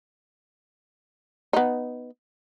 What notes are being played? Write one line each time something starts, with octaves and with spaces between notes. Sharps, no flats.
B3 D#4